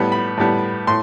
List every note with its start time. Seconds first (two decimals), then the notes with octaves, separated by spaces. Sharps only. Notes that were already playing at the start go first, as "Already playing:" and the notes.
Already playing: A2 G3 B3
0.12 B5
0.37 A2 G3 B3
0.87 A2 C6